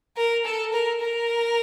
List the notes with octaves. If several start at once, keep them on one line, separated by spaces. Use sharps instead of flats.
A#4
A4
A#4
A#4